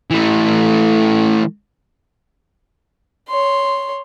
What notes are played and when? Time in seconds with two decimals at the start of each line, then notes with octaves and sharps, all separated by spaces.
0.11 E3 A3
3.29 C#5 C6